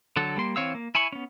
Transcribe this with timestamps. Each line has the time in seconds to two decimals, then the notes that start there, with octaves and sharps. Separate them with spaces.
0.16 D3 F#3 A4
0.37 G3 A#3 C6
0.56 E3 C4 C#5 F5 E6
0.75 A#3
0.95 E4 G#5 B5 C#6
1.12 B3 C#4